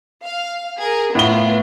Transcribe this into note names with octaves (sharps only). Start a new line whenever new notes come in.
F5
G#4 A#4
A2 B3 F4 G7